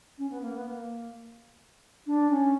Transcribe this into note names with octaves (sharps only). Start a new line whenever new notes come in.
C#4
B3
A#3
B3
A#3
D4
C#4